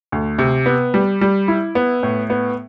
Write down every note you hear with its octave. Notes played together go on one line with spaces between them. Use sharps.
D2
C3
B3
G3
G3
E4
B3
A2
B3